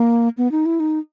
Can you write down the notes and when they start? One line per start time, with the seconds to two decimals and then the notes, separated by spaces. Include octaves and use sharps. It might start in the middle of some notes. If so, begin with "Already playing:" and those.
Already playing: A#3
0.38 B3
0.52 D#4
0.66 E4
0.80 D#4